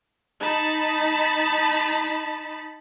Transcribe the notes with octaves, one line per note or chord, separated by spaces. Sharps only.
D#4 A5 B5